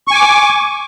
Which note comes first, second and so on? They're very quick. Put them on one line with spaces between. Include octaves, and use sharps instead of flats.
C#6 G#5 D6